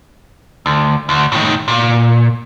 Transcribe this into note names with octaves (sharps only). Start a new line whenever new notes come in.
D2
D2
A2 D#3
A#2